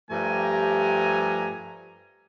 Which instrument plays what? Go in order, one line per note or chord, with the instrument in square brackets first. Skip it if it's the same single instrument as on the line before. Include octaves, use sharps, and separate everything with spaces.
[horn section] G2 F3 A3 G4 G#5 A#5